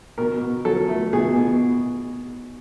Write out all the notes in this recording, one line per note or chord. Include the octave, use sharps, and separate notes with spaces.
B2 A#4
B2
F#3 A4
A3
B2 G#4
B2